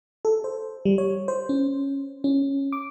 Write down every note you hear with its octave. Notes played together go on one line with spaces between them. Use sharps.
A4
C5
G3
C#5
C5
C#4
C#4
D6